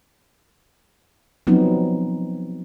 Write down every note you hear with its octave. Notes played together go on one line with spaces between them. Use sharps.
F3 F#3 B3 C4 D#4